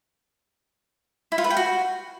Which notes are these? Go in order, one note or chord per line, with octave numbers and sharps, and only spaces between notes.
E4
F4
B4
G5
F#4